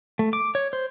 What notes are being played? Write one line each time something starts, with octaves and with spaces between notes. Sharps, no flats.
A3
D6
C#5
C5